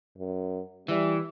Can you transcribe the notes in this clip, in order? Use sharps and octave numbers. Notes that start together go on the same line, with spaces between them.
F#2
E3 G3